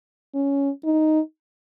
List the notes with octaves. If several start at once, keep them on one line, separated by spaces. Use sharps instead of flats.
C#4
D#4